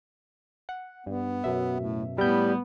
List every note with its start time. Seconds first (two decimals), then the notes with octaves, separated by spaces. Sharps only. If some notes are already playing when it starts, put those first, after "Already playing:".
0.69 F#5
1.06 G2 B3
1.44 F#2 B2 E5
1.80 A2
2.18 A2 G3 B3 G6